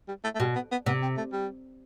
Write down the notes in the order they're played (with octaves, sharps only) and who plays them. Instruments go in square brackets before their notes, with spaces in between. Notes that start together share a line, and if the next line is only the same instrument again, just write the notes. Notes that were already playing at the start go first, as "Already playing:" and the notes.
[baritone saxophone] G3
A3
A3
[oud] B2 [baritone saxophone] G3
[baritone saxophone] B3
B3
[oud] C3 [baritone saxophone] B3
[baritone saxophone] C4
A3
G3